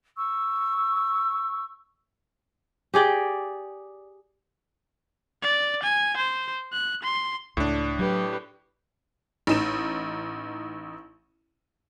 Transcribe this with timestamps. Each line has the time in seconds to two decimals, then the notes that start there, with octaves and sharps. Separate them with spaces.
0.16 C#6 E6
2.94 G4 G#4 D5 G5
5.43 D5
5.83 G#5
6.17 C5
6.73 F#6
7.03 C6
7.57 C#2 A2 D4
7.99 F#3 G4 B4
9.47 A1 D#4 E7